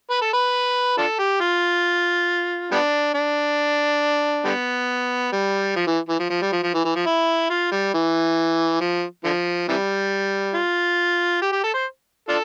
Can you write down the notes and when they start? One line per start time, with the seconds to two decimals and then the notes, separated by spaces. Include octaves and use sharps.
0.10 B4
0.22 A4
0.33 B4
0.98 D4 F4 A4
1.19 G4
1.40 F4
2.72 G3 B3 D4
3.14 D4
4.45 D3 G3 B3
5.32 G3
5.76 F3
5.87 E3
6.09 E3
6.20 F3
6.30 F3
6.42 G3
6.52 F3
6.63 F3
6.74 E3
6.85 E3
6.96 F3
7.06 E4
7.50 F4
7.72 G3
7.94 E3
8.81 F3
9.24 D3 F3
9.68 C3 E3 G3
10.54 F4
11.42 G4
11.52 G4
11.64 A4
11.74 C5
12.29 D4 F4 A4